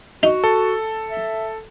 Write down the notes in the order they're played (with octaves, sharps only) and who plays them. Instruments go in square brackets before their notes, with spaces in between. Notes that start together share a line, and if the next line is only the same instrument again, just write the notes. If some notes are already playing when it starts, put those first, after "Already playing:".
[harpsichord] D#4 [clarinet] F#4
[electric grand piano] A4
[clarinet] E5